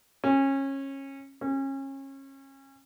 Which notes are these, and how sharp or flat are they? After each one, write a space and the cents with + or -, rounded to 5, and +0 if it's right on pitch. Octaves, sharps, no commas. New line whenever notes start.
C#4 -25
C#4 -30